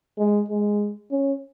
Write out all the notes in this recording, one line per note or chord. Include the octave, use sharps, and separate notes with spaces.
G#3
G#3
C#4